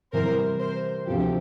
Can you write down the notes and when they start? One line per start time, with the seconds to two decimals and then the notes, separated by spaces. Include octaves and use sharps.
0.13 C3 E3 G3 A#4 C5
0.60 A#4 C5
1.07 D2 C3 F3 G4 A4